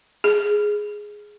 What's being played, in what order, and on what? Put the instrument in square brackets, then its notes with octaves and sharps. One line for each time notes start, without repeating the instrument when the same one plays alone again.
[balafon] G#4